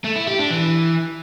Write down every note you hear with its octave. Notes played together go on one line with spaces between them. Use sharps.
A3
E4
G4
D4
E3